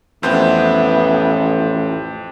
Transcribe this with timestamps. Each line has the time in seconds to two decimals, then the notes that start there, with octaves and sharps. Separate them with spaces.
0.23 A1 F2 B3 C5 E5 G6